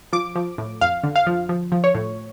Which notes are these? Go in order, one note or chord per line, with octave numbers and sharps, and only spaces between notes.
F3 D6
F3
A2
F2 F5
D3
F5
F3
F3
F3
C#5
A2